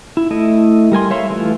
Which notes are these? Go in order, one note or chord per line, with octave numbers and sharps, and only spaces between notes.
E4
A3 E4 D#5
G3 A#4 G#5 C6
C#5 E5 F5 C6
E3 A3 F4